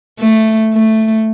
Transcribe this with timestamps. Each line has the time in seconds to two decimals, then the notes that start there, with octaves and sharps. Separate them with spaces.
0.19 A3
0.73 A3